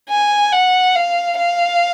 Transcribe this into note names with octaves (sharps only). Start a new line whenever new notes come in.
G#5
F#5
F5
F5